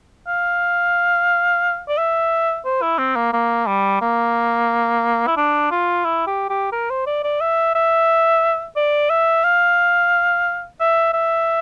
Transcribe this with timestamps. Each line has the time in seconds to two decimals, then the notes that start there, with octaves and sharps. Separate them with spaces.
0.28 F5
1.88 D5
1.98 E5
2.65 C5
2.82 E4
2.99 C4
3.16 A#3
3.33 A#3
3.67 G3
4.01 A#3
5.27 E4
5.37 D4
5.71 F4
6.05 E4
6.27 G4
6.50 G4
6.72 A#4
6.90 C5
7.07 D5
7.24 D5
7.41 E5
7.75 E5
8.76 D5
9.10 E5
9.44 F5
10.80 E5
11.14 E5